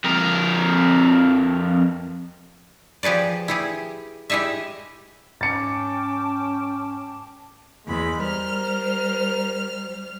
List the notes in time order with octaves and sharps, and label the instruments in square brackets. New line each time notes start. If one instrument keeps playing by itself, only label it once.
[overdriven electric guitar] F2 A#4
[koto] F3 G4 G#4 B4 D5
E4 G4 G#4
G#3 E4 G4 D#5 E5
[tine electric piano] G#2 [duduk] C#4 [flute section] G5 A5 D6 [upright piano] A6 C#7
[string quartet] E2 B5 [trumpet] G#3
[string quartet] G3 C5 F6 [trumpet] A#4